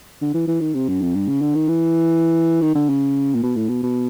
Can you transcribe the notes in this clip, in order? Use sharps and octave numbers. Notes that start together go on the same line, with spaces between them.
D3
E3
E3
D#3
C3
F#2
F2
G2
C#3
D3
D#3
E3
D#3
D3
C#3
A#2
B2
A2
B2
B2